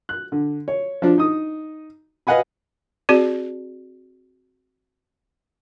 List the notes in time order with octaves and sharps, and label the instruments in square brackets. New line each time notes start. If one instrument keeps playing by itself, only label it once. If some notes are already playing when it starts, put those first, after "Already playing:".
[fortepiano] F#6
D3
C#5
F3 D4
D#4 D#6
B4 D#5 F5 F#5 G#5 B5
[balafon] C4 F#4 G#4 D5